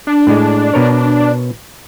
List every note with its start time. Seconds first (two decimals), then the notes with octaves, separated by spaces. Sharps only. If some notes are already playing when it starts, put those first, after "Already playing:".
0.07 D4
0.27 A2 G#3
0.74 B2 A#4 C#5